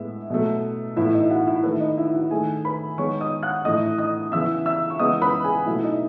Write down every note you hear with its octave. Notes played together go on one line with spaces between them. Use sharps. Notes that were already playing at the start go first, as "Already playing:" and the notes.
Already playing: A2 G#3 B3 E4 E5
B2 F#3 A3
A2 E3 B3 E4 E5
D#4 D#5
F#4 F#5
E4 E5
D#3 A3 B4
D#4 D#5
E4 E5
F#4 F#5
D#3 A3 G#4 G#5
B4 B5
D#3 G#3 B3 C#5 C#6
D#5 D#6
F#5 F#6
A2 E3 A3 D#5 D#6
D#5 D#6
C#3 E3 B3 E5 E6
E5 E6
C#6
C#3 E3 G#3 B3 D#5 D#6
B4 B5
G#4 G#5
B2 F#3 A3 E4 E5
D#4 D#5